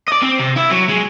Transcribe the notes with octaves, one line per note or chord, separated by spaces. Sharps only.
D5 D#5
C4
C3
E4 E5
F#3
G#3